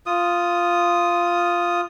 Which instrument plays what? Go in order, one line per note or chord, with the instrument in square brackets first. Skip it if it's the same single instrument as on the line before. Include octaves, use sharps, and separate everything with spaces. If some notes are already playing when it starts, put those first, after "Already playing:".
[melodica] F4 D#6